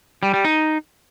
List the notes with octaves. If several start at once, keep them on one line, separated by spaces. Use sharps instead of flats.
G3
G3
D#4